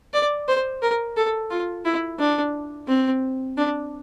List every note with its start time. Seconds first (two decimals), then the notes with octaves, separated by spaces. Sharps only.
0.13 D5
0.48 C5
0.82 A#4
1.17 A4
1.51 F4
1.85 E4
2.19 D4
2.89 C4
3.57 D4